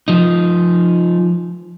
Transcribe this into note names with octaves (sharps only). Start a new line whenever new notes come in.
F3 D#4